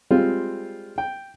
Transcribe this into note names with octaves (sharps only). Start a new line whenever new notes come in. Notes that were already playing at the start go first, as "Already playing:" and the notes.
G3 G#3 C4 F4
G5